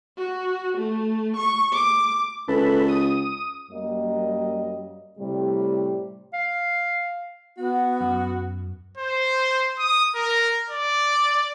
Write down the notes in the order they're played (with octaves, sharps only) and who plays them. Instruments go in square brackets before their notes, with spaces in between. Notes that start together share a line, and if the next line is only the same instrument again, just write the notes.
[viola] F#4
A3
C#6
D6
[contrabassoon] C#2 [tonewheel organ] A4 B4
[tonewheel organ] D#6
[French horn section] F#2 G3 A#3 D#5
A2 C3 G3
[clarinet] F5
[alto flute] B3 [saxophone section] F#4
[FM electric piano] F#2
[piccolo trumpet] C5
D#6
A#4
D5